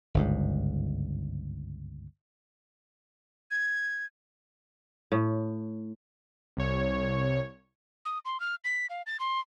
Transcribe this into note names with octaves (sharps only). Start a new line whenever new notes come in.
G1 C#2 G#2
G#6
A2
C2 C#5
D#6
C6
F6
B6
F5
A6
C6